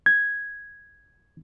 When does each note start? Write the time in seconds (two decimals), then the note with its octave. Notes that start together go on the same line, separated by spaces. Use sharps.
0.06 G#6